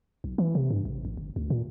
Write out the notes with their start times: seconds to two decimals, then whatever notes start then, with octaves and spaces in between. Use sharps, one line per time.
0.24 B1
0.38 E3
0.55 C3
0.71 G2
0.85 A1
1.05 A1
1.17 G1
1.36 D2
1.50 A#2